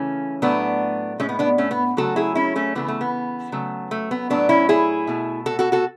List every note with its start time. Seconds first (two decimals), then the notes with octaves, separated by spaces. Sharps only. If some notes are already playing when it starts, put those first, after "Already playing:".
Already playing: C#3 E3 A3 C#4
0.42 A2 F#3 A3 B3 D4
1.20 A2 G#3 A3 C#4
1.29 B3
1.39 B3 D4
1.58 A3 C#4
1.71 B3
1.97 C#3 F#3 A3 F#4 A4
2.16 E4 G#4
2.35 C#4 E4
2.56 A3 C#4
2.75 C#3 E3 A3 B3
2.88 A3
3.01 B3
3.52 C#3 F#3 A3
3.91 A3
4.11 B3
4.30 A2 F#3 A3 B3 D4
4.49 C#4 E4
4.69 E4 G#4
5.07 B2 A3
5.46 F#4 A4
5.59 F#4 A4
5.72 F#4 A4